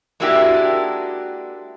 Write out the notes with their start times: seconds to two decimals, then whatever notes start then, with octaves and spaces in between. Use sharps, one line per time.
0.20 G#3 A#3 D4 E4 F#4 G4